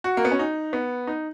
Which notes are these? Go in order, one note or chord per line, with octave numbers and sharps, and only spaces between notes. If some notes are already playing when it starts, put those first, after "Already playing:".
F#4
A#3
B3
C#4
D#4
B3
D#4